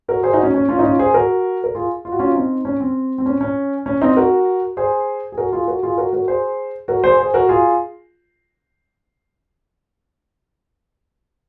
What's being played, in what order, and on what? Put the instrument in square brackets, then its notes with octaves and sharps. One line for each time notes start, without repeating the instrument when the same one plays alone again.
[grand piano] F#4 A#4
G#4 C5
D#4 F#4
C#4
C#4
C#4 F4
D#4
C#4 F4
G#4 C5
F#4 A#4
A#4
F4 G#4
F4
F#4
C#4 F4
C4 D#4
C#4
C4
C4
C#4
C#4
C#4
C4 D#4
F#4 A#4
G#4 C5
G#4
F#4 A#4
F4 G#4
F#4 A#4
F4 G#4
F#4 A#4
F#4 A#4
G#4 C5
F#4 A#4
G#4 C5
G#4 C5
F#4 A#4
F4 G#4